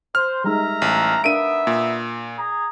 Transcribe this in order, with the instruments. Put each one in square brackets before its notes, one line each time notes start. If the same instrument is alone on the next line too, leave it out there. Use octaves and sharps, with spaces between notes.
[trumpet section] C5 [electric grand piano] F6
[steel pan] G3 G#3 D#4 [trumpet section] A#4 E5 A#5
[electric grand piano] A1
[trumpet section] B3 D#4 E5 [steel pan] D4 A#4 F5 [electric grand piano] D7 D#7
[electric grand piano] A#2
[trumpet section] G#4 A#5